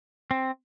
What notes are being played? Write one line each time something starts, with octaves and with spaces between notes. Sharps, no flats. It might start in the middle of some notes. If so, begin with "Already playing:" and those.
C4